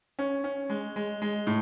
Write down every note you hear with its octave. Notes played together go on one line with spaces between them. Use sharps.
C#4
C#4
G#3
G#3
G#3
A2